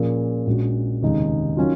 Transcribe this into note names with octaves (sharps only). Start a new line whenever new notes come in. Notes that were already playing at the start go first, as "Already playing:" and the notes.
Already playing: A#2 F3 A#3 C#4 G#4
A#1 A#2 G#3 C#4 F#4
F1 D#2 C#3 G#3 D#4
D#3 F#3 C#4 F4